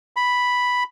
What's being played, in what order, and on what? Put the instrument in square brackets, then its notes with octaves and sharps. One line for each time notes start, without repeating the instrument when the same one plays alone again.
[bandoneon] B5